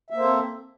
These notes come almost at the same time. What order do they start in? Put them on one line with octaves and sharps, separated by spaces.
E5 A#3 C5 A4 C4